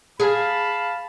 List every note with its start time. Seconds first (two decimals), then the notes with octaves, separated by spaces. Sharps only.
0.20 G#4 F5 A5 B5